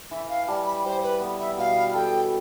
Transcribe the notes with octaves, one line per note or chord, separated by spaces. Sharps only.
E3 E5
E5
F5
G3 A5
B5
G3 C5
B4
B3
E5
B2 F5
A4 G5